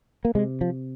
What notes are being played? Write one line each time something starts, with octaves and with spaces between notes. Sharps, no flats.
A#3
C3 G#3
F3